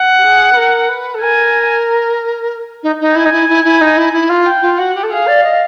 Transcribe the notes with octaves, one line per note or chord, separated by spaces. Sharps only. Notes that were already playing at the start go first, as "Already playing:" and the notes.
Already playing: F#5
G4
G#4
B4
A#4
B4
A4
A#4 G#5
D#4
D#4
E4 G#5
D#4
E4
E4
E4
D#4
E4
E4
F4
G5
F4
F#4 F#5
G4
A4
G#4 F5
D5
D#5